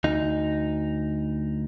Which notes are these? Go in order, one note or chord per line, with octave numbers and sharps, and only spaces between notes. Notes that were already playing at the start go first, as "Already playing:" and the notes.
D2 D#4